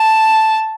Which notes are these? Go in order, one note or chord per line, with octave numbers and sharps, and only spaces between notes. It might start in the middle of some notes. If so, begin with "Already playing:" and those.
Already playing: A5